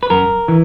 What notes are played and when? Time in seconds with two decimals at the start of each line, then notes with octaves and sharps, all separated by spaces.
0.03 B4
0.10 F#2 A#4
0.48 E3